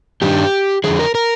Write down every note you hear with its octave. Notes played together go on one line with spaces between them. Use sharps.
G2 D#3 G3 D4 G4
F2 D3 F3 G#4
A#4
A#4